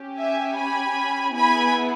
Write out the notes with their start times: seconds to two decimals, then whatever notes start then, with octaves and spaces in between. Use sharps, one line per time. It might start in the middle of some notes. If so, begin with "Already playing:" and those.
Already playing: C#4 G4
0.18 E5 G#5
0.57 G#5 B5
1.35 B3 E4 G#4 G#5 B5